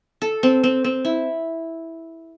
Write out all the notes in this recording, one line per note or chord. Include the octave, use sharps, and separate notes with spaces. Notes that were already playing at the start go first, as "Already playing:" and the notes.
A4
C4
C4
C4
E4